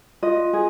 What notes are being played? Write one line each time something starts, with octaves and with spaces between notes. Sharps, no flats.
F4 D#5
G#4